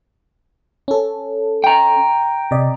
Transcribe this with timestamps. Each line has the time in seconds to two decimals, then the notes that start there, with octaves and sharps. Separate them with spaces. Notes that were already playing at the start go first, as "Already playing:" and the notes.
0.88 C#4 A4
1.64 G5 A#5
2.51 C3 D5 D#5